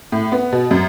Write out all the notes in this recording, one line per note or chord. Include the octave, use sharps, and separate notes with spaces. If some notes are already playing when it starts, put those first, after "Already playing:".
A2
B3
B2
F#2